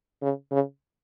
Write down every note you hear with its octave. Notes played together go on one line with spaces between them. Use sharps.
C#3
C#3